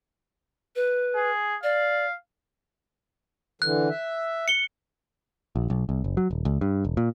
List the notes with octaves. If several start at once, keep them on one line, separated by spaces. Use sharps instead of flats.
B4
G#4
D5 F5
D3 E3 F#6
E5
C#7 G7
A#1
B1
C2
F#1
F#3
D#1
C#2
G2
E1
A#2